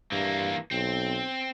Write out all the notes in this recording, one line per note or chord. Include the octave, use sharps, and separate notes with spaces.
G2 E3 A#3
B1 C4